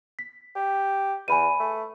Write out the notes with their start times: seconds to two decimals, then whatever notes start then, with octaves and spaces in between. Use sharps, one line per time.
0.19 B6
0.56 G4
1.28 E2 G#5 B5 D#7
1.60 A3